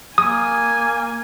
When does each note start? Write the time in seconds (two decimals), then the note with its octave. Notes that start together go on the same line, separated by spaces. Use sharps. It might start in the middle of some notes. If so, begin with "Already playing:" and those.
0.18 A#3 G#5 D#6